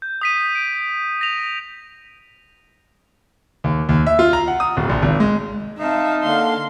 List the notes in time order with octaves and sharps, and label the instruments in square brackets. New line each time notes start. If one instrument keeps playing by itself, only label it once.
[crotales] G6
D#6 B6 D#7
D7
A#6 F7
[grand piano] D#2
D#2
E5
F4
A#5
F#5
D#6
D1
A#1
G#1
G#3
[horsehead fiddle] C4 F5 [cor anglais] D#4 [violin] E5 A5
[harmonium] D3 A#3 D4 [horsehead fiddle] F5 [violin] C6